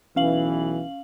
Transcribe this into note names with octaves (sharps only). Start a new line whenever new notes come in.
B1 E3 C#4 F5 F#7